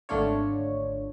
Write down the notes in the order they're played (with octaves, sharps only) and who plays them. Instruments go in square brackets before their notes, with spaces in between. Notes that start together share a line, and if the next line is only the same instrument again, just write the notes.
[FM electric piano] G#1 D3 A3 D4 F4 C#5